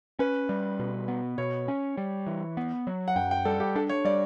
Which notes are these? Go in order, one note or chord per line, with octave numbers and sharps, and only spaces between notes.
C#4 B4
G3
B2
B3
B2 C#5
C#4
G3
E3
B3
F#3
F#5
F#2 G5
G5
G3 A4
G4
D4 A4
C#5
G3 D5